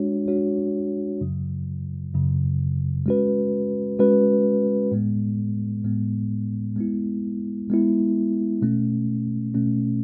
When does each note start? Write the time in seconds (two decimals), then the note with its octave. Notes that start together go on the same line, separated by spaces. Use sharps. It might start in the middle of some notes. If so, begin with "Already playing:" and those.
Already playing: G#3 D4 F#4 C#5
0.28 G#3 D4 F#4 C#5
1.21 F#2 C#3 F#3
2.14 F#2 C#3 F#3
3.06 G#3 C#4 F#4 B4
3.99 G#3 C#4 F#4 B4
4.91 A2 G#3 B3
5.84 A2 G#3 B3
6.76 G#3 B3 E4
7.70 G#3 B3 E4
8.62 B2 A3 C#4
9.54 B2 A3 C#4